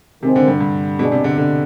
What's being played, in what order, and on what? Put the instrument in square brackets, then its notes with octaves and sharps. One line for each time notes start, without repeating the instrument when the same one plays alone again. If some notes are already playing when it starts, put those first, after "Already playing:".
[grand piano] C3 [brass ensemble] D#3 G#3 C4
[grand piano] D3
G2
G2
[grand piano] B2 [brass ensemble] G#3 D4 G#4 D5
[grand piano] C3
D3
D3